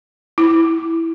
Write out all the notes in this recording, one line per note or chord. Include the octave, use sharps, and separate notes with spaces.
E4